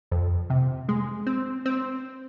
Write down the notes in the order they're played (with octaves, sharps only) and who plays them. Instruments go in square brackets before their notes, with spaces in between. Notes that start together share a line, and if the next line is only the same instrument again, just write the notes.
[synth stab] F2
C3
G#3
C4
C4